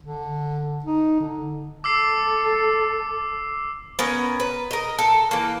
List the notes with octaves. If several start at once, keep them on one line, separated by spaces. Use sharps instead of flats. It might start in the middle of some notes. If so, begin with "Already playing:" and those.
D3
D#4
D3
A4 D6 E6 C7
B3 C#4 A#4
B4
A#4 D#5
A4
E3 A#3